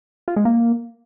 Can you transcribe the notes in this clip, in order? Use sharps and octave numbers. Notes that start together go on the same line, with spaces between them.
F4
G#3
A#3